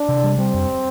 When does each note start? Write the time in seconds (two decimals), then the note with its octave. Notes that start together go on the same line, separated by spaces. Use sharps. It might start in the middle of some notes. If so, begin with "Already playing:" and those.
Already playing: D4
0.09 C3
0.24 G3
0.38 G3 C4
0.54 F2